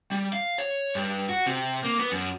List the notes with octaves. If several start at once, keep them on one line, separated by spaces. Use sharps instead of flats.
G3
F5
C#5
G2
F#4
C3
A#3
B3
F#2